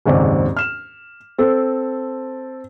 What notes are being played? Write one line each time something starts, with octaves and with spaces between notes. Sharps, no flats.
F#1 D#2 G#2 C4 D5
F6 E7
C4 A4 C5